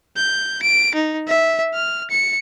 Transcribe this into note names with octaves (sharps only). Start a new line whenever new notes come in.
G6
D7
D#4
E5
F6
C#7